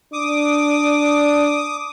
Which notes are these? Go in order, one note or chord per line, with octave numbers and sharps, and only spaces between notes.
D4 D6 D#6